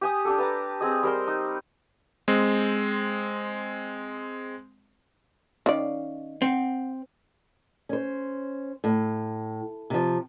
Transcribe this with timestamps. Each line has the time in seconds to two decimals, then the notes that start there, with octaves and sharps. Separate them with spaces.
0.01 G4 G#5 D#6
0.25 D4 G4 A4
0.38 B4 A5 A#5
0.81 C4 G#4 D#5
1.03 G3 A#4 C5 C6
1.28 D#4
2.28 G#3 C4
5.66 D#3 C#4 D5 F5
6.42 C4 F#5
7.89 C#4 C5
8.84 A2
9.90 C3 F3